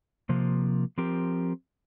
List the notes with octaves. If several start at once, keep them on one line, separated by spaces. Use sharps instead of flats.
C3 F3 A#3
F3 C4 G4 A#4